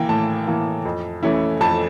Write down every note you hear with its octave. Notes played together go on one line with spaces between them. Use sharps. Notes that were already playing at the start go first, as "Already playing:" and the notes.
Already playing: E3 A#3 G5
A2 A5
E3 A#3
F2
E3 A3 C#4 E4
F2 A5